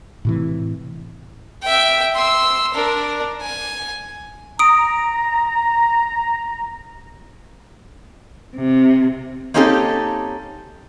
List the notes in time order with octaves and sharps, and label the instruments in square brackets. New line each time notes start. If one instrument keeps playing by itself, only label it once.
[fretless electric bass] A2 C3 E3
[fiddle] E5 G5
C6 E6
D4 A#4
G#5
[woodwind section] A#5 [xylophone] D#6 D7
[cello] C3
[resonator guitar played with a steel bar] A#3 C4 C#4 D#4 G4 A4